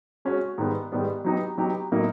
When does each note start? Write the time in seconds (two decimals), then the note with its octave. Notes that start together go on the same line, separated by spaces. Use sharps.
0.25 G#3 C#4 F#4
0.58 G#2 D#3 G3 B3
0.92 G#2 D#3 G3 B3
1.25 F#3 B3 D#4 G4
1.58 F#3 B3 D#4 G4
1.92 A2 F#3 A#3 D#4